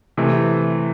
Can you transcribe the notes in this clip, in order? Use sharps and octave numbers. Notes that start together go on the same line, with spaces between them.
C3 E3 A3